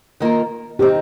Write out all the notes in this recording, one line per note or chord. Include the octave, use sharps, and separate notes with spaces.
D#3 A#3 F4 A#4
D#3 C4 D#4 G4